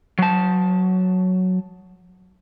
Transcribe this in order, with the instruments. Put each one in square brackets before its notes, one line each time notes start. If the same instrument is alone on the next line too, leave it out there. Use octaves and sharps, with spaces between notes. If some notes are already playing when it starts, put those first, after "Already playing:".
[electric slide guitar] F#3 A5